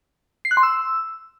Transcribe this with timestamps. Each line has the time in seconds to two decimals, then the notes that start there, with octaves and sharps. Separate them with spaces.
0.45 C7
0.51 F#6
0.57 C6
0.63 E6